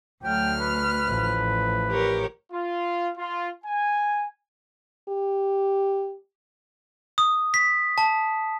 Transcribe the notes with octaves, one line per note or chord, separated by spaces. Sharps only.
D2 F#3 A3 G5 F6
B4
A1 F3
G4 A#4 C#5
F4
F4
G#5
G4
D#6
B6
A5